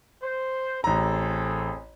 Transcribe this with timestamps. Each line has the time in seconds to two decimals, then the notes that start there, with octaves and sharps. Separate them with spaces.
0.23 C5
0.84 A1 C4 G#4 A4 A#5